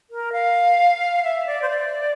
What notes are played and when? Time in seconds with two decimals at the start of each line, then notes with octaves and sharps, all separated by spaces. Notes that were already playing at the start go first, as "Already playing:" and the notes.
0.10 A#4
0.32 F5
1.23 E5
1.46 D5
1.62 C5
1.69 D5